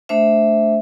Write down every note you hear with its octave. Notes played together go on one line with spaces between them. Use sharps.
A3 D4 C5 E5